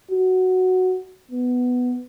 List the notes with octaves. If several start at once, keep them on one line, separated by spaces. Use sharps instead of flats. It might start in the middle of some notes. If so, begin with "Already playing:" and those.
F#4
B3